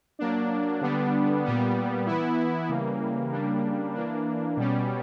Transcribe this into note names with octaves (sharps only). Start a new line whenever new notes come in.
F#3 A#3 D4
D3 G3 B3 D4
A#2 G3 B3
E3 B3 E4
C#3 E3 G3 A#3
C#3 G3 A#3 D4
E3 A#3 D4
B2 G3 C#4